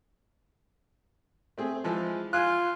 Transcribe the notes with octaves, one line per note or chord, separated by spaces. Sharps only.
A3 C4 G#4
E3 F3 G#3
F4 G#5 F#6